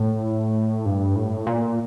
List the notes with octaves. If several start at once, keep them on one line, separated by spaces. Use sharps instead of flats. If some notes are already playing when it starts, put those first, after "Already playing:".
Already playing: A2
G2
A2
A#2